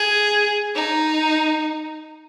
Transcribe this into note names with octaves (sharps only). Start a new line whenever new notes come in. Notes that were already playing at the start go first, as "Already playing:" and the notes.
Already playing: G#4
D#4